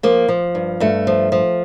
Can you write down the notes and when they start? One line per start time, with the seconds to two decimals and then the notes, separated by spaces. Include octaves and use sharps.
0.03 F3 A#3
0.28 F3
0.55 G2
0.80 G2 A3
1.07 F3
1.32 F3